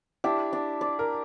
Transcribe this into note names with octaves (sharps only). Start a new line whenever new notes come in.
D4 E4 G4
D4
D5
A#4